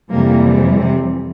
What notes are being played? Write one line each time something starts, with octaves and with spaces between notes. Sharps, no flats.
F2 C3 E3 G3 A#3
C3 C4